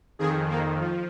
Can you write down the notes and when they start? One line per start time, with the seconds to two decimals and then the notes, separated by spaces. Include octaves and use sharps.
0.19 F2 D#3 G#4
0.49 A#3
0.80 F3